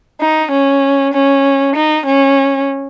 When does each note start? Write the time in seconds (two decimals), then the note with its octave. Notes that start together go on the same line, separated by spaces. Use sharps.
0.20 D#4
0.51 C#4
1.13 C#4
1.76 D#4
2.06 C#4